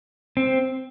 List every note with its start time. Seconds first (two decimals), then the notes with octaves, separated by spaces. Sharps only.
0.37 C4